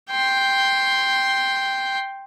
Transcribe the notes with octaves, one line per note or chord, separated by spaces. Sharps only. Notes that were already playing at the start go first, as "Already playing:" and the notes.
G5 C6